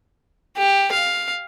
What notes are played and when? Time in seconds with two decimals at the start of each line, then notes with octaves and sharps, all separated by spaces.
0.57 G4
0.92 F5